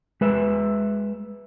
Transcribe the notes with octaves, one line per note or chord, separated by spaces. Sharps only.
G#3 B4 E5